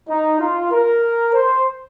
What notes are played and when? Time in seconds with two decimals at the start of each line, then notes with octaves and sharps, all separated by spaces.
0.09 D#4
0.39 F4
0.72 A#4
1.34 C5